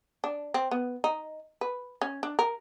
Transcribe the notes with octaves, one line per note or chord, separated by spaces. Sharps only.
D4
C4
B3
D#4
B4
C#4
D4
A#4